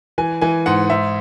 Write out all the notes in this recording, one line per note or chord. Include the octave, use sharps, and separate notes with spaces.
E3 G#5
E3 G#5
G#2 F#5
G#2 E5